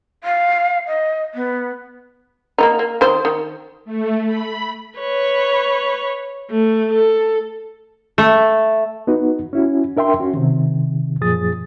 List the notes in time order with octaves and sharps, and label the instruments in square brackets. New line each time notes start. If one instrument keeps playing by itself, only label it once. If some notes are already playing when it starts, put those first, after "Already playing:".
[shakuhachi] F5
D#5
B3
[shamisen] A#3 B3 D#4
A#3
D#3 C5
D#3
[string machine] A3
B5
[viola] B4 C#5
A3
A4
[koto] A3
[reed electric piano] B3 D#4 F#4 B4
C#4 E4 F#4
D4 A#4 E5 G5 C6
C#4 F#4
C3 D#3
F#2 A#2 F3 G#4 D#6 A6